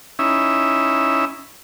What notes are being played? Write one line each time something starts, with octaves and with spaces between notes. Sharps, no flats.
C#4 D#4 E4 E5